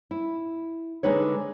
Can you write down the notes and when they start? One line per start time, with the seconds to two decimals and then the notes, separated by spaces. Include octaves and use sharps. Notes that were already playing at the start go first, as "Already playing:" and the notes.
0.11 E4
1.03 D3 G#3 D#4 B4 C#5